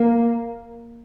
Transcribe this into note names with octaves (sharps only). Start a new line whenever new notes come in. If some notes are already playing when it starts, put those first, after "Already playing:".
Already playing: A#3